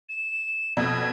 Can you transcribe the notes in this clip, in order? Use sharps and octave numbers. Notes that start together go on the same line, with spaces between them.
E7
F2 B2 G#6